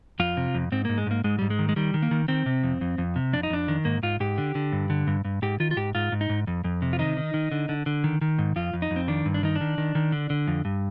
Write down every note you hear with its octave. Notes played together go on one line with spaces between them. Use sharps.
F2 F4
C3
F2
G#2 C4
G#2 A#3
G#3
G#2 A#3
G#2 G#3
G#2 G3
G#3
D#3
G#3
D#3 G3
D#3
A#3
D#3
D#3 C4
C3
F2
F2
F2
C3
F2 D4
D#4
F2 D4
D#3
G#2 A#3
G#2 F4
G#2 G4
D3
D3
G2
D3
G2
G2
G#2 G4
D#3 F4
F4
G#2 G4
G#2 F4
G#2
D#4
G#2
F2
F2
C3
F4
D#3 D#4
D#3
D#3
D3
D3
D3
D#3
D#3
G#2
F2 F4
F2
D#4
F2
C4
D#3 D4
G2
D4
D#3 D#4
D4
D#3
D#3
D#3
D3
D3
F2
G2